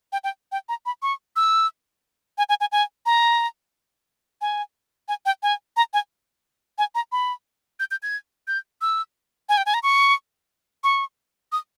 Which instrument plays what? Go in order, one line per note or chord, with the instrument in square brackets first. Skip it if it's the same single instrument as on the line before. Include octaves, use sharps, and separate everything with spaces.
[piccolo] G5
G5
G5
A#5
B5
C#6
E6
G#5
G#5
G#5
G#5
A#5
G#5
G#5
G5
G#5
A#5
G#5
G#5
A#5
B5
G6
G6
G#6
G6
E6
G#5
G5
G#5
A#5
C#6
C#6
D#6